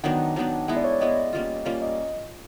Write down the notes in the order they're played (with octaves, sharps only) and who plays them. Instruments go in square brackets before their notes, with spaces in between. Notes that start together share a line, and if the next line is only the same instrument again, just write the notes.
[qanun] D#3 F#3 B3 D4 [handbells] F#5
[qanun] D#3 F#3 B3 D4
[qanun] G#3 B3 E4 [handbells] F#5
[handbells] D5
C#5
D5
[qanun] G#3 B3 E4 [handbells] D#5
[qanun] G3 A#3 C#4 F4
[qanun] G3 A#3 C#4 F4 [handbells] D5
[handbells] D#5